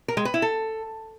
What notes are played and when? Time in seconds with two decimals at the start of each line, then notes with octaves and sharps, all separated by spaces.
0.08 A#4
0.17 G#3
0.25 B4
0.34 E4
0.42 A4